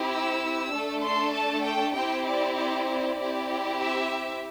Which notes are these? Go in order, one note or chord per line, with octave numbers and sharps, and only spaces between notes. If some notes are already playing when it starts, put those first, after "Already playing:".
Already playing: C4 E4 G4
E6
A3 D4 A4
C6
A5
G5
C4 E4 G4 G5
D5
D5
D5
C4 E4 G4
E5